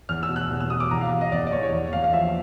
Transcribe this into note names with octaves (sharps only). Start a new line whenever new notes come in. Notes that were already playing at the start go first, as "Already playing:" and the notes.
E2 F6
E6
B2
F#6
E2
E6
B2 D#6
D6
E2 A#5
F5
E2
D#5
E2 D5
D5
E2 C#5
C#5
E2 D5
E2 F5
F5
F3 E5